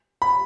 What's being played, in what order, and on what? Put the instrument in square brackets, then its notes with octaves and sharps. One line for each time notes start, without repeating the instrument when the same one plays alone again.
[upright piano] B5